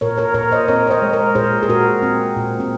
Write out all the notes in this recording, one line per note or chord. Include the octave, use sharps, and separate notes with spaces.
A#2 A#4 C#5
A#4 C#5
A#2 A#4 C#5
C5 D#5
C4 A#4 C#5
C#5
C5 D#5
G#3
A#4 C#5
A#2 G#4 C5
G#4
A#2 F#4 A#4
C4
A#2
C4